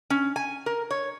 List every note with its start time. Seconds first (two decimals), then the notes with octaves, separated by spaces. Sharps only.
0.10 C#4
0.36 G#5
0.66 A#4
0.91 C#5